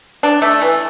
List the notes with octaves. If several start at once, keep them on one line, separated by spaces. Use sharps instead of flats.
D4
A3
E3